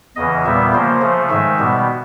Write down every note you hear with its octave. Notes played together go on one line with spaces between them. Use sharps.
E2 C#3 E3 D#5
A#2 G3 B3 E5
C#3 F3 A#3 C5
C#3 F3 A3
G#2 D#3 G#3 E5
B2 G3 B3